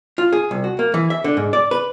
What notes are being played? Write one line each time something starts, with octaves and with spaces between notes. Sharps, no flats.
F4
G#4
C2
F#4
A#3
E3
E5
D3
G#2
D5
B4